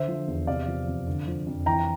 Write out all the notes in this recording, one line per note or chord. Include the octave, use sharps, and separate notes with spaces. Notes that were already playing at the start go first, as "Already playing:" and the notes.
Already playing: D3 C5 E5
F3
E2
C3 D5 F5
F3
F2
D3
F3
F2
E3 G5 A#5